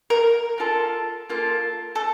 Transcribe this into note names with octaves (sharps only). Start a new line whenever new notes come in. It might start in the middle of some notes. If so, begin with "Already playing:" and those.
A#4
A#3 F4 A4
A#3 F4 A4
A4